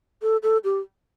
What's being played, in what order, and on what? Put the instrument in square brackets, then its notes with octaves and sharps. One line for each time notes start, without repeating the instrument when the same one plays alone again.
[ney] A4
A4
G4